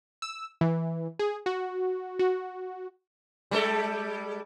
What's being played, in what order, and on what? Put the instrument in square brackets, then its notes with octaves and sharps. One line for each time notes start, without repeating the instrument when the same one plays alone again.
[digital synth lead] E6
E3
G#4
F#4
F#4
[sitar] G3 G#3 A4